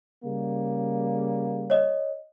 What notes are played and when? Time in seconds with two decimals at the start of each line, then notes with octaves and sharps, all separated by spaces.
0.24 C#3 G3 A#3
1.70 C#5 D#5